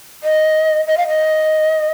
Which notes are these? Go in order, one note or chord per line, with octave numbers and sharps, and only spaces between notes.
D#5
D#5
F5
D#5